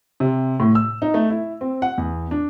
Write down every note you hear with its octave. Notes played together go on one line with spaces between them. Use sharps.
C3
A2
E6
D#4
A3
E4
C4
F#5
E2
D4